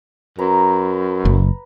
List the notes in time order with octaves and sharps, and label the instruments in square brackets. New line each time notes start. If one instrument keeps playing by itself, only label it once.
[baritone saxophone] F#2 [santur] B4 A#5
[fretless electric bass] F#1